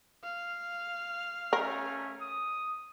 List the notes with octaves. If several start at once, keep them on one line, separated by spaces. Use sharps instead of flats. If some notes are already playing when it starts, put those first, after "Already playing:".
F5
A3 C#4 A#4
D#6